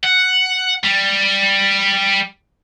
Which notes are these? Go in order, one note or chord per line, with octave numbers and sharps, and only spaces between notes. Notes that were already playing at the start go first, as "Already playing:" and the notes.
F#5
G3